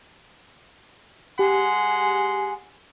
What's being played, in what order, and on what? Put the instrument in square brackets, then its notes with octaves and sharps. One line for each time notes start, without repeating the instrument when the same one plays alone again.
[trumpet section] G#3 F#5 C6 [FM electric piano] G4 [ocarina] G#5